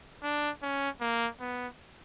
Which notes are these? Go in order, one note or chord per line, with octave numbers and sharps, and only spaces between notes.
D4
C#4
A#3
B3